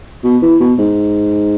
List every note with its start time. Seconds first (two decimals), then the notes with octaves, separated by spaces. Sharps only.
0.24 B2
0.42 E3
0.60 B2
0.79 G#2